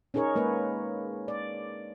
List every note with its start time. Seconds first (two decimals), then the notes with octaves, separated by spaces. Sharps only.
0.14 C#4 D#4 G#4 A#4 C#5
0.35 G#3 A#3 G#4 B4
1.28 D5